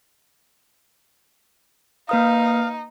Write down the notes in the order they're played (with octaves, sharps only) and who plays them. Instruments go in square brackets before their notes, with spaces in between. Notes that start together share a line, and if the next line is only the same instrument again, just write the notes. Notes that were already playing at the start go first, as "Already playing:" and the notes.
[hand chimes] A#3 B4 D#6 [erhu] D#4 [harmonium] F5